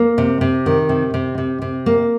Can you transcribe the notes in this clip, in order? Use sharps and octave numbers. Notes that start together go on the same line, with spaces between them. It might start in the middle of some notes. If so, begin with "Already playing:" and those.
Already playing: A#3
C3
C3
D#3
C3
C3
C3
C3
A#3